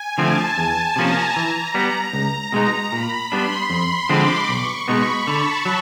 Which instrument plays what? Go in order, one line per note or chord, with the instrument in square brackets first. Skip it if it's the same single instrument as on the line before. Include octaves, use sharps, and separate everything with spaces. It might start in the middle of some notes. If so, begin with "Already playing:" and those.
Already playing: [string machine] G#5
[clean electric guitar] D3 F3 A3 C4 [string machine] A5
[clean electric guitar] E2 [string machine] A5
[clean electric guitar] C3 F3 A#3 C#4 [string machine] A#5
[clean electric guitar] E3
G3 B3
C#2
B2 G#3 B3 D#4
[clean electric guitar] A#2 [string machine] B5
[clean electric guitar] G3 B3 D4 [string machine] C6
[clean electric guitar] F2
[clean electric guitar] D3 F3 G#3 C4 [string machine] D6
[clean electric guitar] B1 [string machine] C#6
[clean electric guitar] B2 G#3 B3 D#4 [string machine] B5
[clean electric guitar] D3 [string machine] A5
[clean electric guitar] F#3